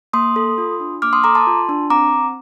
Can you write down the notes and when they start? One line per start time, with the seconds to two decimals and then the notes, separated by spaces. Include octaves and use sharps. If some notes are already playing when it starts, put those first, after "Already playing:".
0.13 A#3 C6 D#6
0.36 A4
0.58 F4
0.80 D4
1.02 A#3 D6 F6
1.13 C6 D#6
1.24 A4 A#5 D6
1.35 A5 C6
1.47 F4
1.69 D4
1.90 C4 A#5 D6